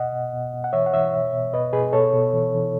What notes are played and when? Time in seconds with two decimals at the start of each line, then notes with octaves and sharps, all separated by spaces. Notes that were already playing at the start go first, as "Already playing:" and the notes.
Already playing: B2 D#5 F#5
0.13 B2
0.33 B2
0.53 B2
0.64 F#5
0.73 E3 C#5 E5
0.86 F#5
0.93 E3 C#5 E5
1.13 B2
1.33 B2
1.53 B2 B4 D#5
1.73 B2 G#4 B4
1.93 B2 A4 C#5
2.13 B2
2.33 E3
2.54 E3